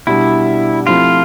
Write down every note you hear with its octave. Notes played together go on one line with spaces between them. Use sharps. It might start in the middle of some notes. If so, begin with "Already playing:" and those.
B2 G3 D4 E4
F3 A3 C4 E4 F4 G4